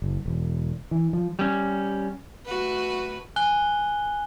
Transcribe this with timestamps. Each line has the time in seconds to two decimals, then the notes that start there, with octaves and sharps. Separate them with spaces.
0.02 F#1
0.26 E1
0.91 E3
1.13 F3
1.39 G3 C#4
2.46 A3 F#4 B4
3.36 G#5 F#6 G7